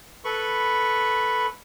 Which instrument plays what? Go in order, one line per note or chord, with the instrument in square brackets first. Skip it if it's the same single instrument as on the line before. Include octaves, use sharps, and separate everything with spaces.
[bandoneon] A4 B4 B5 C#6